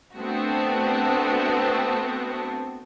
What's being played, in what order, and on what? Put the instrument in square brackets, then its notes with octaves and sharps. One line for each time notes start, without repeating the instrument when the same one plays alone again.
[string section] A3 B3 C4 D4 F#4